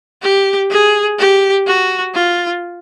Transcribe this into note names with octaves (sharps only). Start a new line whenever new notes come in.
G4
G#4
G4
F#4
F4